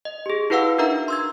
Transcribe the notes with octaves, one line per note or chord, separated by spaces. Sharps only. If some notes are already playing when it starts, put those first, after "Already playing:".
D#5
G4 G#4
E4 F#4 B4 F5 F#5 E6
D4 D#4 A#4 E5 A#5
C6 E6 G#6